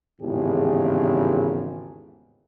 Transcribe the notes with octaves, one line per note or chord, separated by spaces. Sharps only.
G#1 E2 A2 C#3 G4 G#4